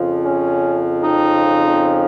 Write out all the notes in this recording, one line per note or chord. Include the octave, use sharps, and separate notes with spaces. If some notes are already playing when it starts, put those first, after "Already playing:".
Already playing: F2 C#3 F3
C#4
C4 D#4